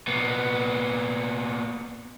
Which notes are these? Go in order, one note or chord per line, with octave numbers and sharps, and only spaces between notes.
A#2 B3